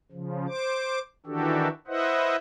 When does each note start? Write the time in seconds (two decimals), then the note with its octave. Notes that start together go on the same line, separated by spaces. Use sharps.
0.12 C#3 F3
0.48 C5 D6
1.26 D#3 E3 D4 F#4 G4 A4
1.87 E4 B4 C5 D#5 E5 F#5